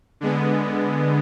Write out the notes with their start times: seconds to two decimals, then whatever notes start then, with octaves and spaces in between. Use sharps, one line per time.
0.21 D3 G#3 B3